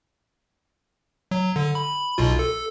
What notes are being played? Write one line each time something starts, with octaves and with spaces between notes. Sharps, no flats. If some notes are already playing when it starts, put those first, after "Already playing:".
F#3
D3
B5
B1 B2 F4
A4